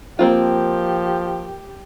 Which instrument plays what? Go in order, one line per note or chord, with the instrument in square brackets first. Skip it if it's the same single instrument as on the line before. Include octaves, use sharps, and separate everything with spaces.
[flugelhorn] F3 [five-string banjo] A#3 C4 F4 [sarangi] G4